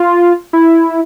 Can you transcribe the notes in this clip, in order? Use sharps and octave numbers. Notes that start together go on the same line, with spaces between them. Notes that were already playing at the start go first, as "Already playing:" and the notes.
Already playing: F4
E4